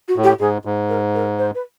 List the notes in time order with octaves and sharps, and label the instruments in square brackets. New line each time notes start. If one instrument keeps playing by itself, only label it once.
[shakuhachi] F#4
[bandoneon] A2
[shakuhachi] G4
[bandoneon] G#2 [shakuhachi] G#4
[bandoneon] G#2
[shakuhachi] A#4
A#4
C5
B4